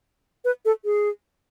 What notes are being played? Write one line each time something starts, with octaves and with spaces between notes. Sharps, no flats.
B4
A4
G#4